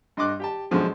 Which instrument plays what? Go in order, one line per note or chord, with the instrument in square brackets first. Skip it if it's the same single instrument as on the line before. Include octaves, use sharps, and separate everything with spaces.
[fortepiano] G2 D#5 C6 D6 F#6
G4 G5 A5
F#2 B2 D3 F3 G#3